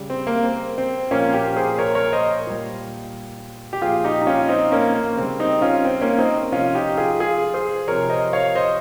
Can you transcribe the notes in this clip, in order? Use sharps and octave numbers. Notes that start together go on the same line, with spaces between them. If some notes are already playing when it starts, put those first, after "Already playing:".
Already playing: C#3 G3
C4
A#3
C4
C4
A#2 F3 A#3 C#4
G4 A#4
G#4 C5
A#4 C#5
A#4 C#5
C5 D#5
A#2 G3
G4
A#2 F3 F4 G#4
D#4 G4
D#4
C#4 F4
C4 D#4
A#3 C#4
A#3
C#3 G3 C4
C4 D#4
C#4 F4
C4
A#3 C#4
C4 D#4
C3 F3 C#4 F4
D#4 G4
F4 G#4
F4 G#4
G#4 C5
C3 F3 A#4 C#5
C5 D#5
C#5 F5
C5 D#5